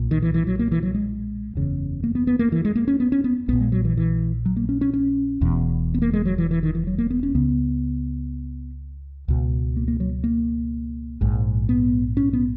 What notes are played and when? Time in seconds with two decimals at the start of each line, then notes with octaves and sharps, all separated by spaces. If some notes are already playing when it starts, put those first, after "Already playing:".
Already playing: B1 A#2
0.11 D#3
0.22 E3
0.34 E3
0.47 F#3
0.59 A#3
0.72 E3
0.83 F#3
0.94 G#3
1.55 F#1 E2 C#3
2.04 A#3
2.15 B3
2.27 B3
2.39 A#3
2.52 E3
2.65 G#3
2.75 A#3
2.88 C#4
3.00 B3
3.12 C#4
3.24 B3
3.48 A#1 B3
3.53 A#2
3.61 G#3
3.72 F#3
3.85 E3
3.97 E3
4.46 F#3
4.56 A#3
4.69 C#4
4.81 C#4
4.93 C#4
5.41 E1 E2 B2
5.94 B3
6.02 A#3
6.13 G#3
6.25 F#3
6.38 E3
6.51 E3
6.63 D#3
6.75 E3
6.87 F#3
6.98 A#3
7.10 B3
7.23 C#4
7.34 C#2 C#3 B3
9.28 C#2 B2
9.77 A#3
9.88 A#3
10.00 F#3
10.24 A#3
11.21 A#1 G#2
11.69 B3
12.17 C#4
12.33 B3